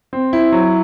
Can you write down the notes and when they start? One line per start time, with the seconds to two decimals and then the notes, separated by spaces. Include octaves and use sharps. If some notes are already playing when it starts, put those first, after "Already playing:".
0.13 C4
0.33 E4
0.52 F#3